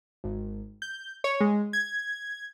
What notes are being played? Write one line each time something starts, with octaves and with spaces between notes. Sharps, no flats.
G#1
G6
C#5
G#3
G#6